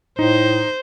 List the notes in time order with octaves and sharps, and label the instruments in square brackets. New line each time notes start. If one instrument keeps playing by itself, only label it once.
[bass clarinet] A2 [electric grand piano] D#4 [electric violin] C5